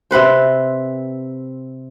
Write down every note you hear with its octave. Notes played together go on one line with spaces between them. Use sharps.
C3 C4 B4 C5